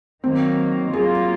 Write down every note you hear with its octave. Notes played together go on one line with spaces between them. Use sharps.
D#3 F#3 A#3 C4
F#3 A#3 F4 G#4